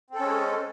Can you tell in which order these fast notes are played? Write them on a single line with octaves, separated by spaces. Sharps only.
C4 A4 C#4 G#3